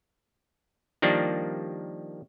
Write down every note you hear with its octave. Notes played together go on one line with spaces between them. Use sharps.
D#3 F3 G3 A#3 D4